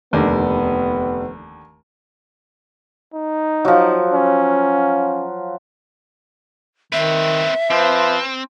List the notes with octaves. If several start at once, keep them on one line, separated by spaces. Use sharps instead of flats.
F1 D#2 D3 B3
D#4
F3 F#3
C#4
D#3 C4 B4 E5
F3 C4 B4